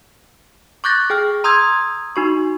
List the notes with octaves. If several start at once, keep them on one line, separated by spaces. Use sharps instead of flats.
C#6 D6 F#6 G6 A6 A#6
G#4 G5 F6
A#5 C6 D#6 E6 G6 G#6
D#4 F#4 C#6